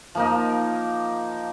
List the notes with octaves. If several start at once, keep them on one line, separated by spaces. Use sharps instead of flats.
F3 A#3 D#4